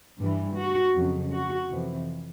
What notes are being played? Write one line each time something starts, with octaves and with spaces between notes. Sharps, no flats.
G2 E3
F#4
F2 C#3 F#3
F#4
F2 C3 E3